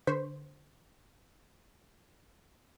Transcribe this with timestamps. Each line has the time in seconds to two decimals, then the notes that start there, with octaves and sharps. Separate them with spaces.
0.07 D3 B4 C5 C#6 B6